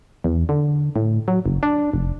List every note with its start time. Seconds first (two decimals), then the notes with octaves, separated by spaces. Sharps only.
0.24 E2
0.49 D3
0.96 A2
1.28 F#3
1.46 F#1
1.63 D4
1.94 F1